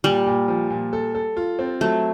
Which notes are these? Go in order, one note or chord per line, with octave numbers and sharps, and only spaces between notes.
A#2 G3
A#2
F3
A#2
A4
A4
F4
C4
F#3 A3